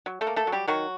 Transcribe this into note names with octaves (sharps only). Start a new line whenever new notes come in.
F#3
A3 A4
A#3
A3 A4
F#3
G3 G4
D#3 F#3 F#4